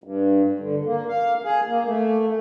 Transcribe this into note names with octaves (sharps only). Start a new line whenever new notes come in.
G2
D3
A#3
F5
G#4
A#3
A3